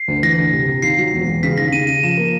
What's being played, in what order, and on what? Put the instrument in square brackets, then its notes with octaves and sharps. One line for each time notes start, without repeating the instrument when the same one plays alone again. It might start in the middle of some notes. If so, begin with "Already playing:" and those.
Already playing: [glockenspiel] C7
[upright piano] D2
[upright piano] E3 [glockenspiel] A#6
[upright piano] D2
C3
C3
[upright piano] D#2 [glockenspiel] C7
[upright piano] F#3
E1
E1
[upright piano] C#3 [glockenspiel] B6
[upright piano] D#2 [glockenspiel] A#6
[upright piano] C#3 [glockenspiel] D#7
[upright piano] C#3 [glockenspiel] D#7
[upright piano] F3 [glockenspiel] E7
[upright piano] A#3